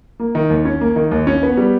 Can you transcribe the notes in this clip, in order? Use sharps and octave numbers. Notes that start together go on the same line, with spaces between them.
A#3
D#3
D#2
C#4
A#3
D#3
D#2
C#4
B3
G3